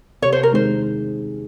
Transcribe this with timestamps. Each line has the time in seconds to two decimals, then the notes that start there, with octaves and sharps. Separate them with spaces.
0.22 C3 C#5
0.32 C5
0.43 A#4
0.52 D#3 G#3 C4 C5